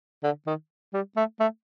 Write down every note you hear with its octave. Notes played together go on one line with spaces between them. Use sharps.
D3
D#3
G3
A3
A3